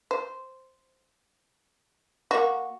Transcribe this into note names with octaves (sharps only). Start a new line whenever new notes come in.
C5
A#3 F#4